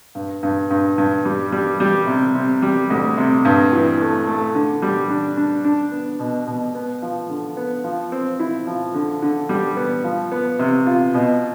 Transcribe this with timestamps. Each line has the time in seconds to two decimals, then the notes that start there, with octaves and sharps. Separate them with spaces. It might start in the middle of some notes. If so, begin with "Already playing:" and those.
0.15 G2
0.43 G2
0.70 G2
0.98 G2
1.25 G3
1.52 G3
1.80 G3
2.07 C3
2.35 C3
2.62 G3
2.90 D2
3.18 C3
3.45 G2
3.72 E3
4.00 A3
4.27 A3
4.55 D3
4.82 G3
5.10 D4
5.37 D4
5.65 D4
5.92 B3
6.19 B2
6.47 B2
6.75 B3
7.02 F3
7.29 D3
7.57 B3
7.84 F3
8.12 C4
8.40 E4
8.67 F3
8.94 D3
9.22 D3
9.49 G3
9.77 B3
10.04 F3
10.32 B3
10.59 C3
10.87 F4
11.14 B2